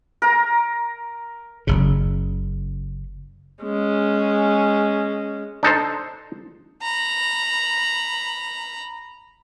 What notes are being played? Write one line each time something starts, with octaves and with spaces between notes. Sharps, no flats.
A#4 A#5
F#1 C#3
G#3 C#4
D4 D#4 A4 C5
A#5 B5